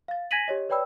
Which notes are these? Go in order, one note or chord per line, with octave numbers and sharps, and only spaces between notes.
F5 A6
G#5 G#6 A#6 B6 D#7 F#7
G4 C#5 D#5
B4 C#5 D5 G5 B5 E6